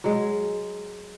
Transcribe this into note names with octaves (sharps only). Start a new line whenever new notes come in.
F#3 G#3